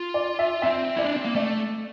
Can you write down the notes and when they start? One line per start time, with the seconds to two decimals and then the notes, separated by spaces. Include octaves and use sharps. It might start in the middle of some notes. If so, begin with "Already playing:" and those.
Already playing: F4
0.14 D5
0.39 E5
0.62 C4 E5
0.96 E4 D5
1.06 D4
1.16 C4
1.25 A#3
1.35 A3 D5